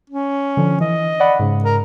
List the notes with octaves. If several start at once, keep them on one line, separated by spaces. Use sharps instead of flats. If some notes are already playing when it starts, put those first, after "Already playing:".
C#4
D3 F3
E3 D#5
D5 F#5 B5
G#2 C#3
A#4